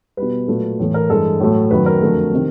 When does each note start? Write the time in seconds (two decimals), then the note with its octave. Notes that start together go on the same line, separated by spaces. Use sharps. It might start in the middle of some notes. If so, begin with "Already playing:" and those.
0.17 B2 G3 B4
0.48 A#2 F#3 A3
0.80 A2 E3 A3
0.94 A#4
1.09 G2 E3 G#3 A4
1.40 A2 F#3 A3
1.71 F#2 D#3 F#3 A3 B4
1.86 A#4
2.02 F2 D3 F#3 A3
2.33 C3 D#3